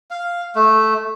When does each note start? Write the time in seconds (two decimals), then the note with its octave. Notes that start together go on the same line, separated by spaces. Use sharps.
0.11 F5
0.55 A3